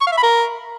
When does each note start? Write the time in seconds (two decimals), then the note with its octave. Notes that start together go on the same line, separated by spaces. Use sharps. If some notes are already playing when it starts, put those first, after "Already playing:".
0.01 C#6
0.07 F5
0.12 E5
0.17 B5
0.23 A#4